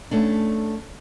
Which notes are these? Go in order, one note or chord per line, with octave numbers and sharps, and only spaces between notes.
A3 C#4 D4